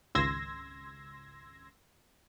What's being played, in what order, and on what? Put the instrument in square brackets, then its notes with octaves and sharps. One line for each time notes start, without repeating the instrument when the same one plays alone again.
[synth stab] G#1 C#2 C6 E6 G#6 A#6